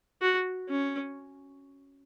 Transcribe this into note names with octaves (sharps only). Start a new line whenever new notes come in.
F#4
C#4